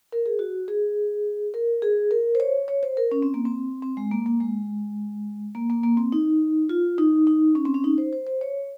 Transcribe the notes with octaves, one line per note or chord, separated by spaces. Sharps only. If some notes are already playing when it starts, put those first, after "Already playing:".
A#4
G#4
F#4
G#4
A#4
G#4
A#4
C5
C#5
C#5
C5
A#4
C#4
C4
A#3
C4
C4
G#3
A#3
A#3
G#3
A#3
A#3
A#3
C4
D#4
F4
D#4
D#4
C#4
C4
C#4
D#4
C5
C5
C5
C#5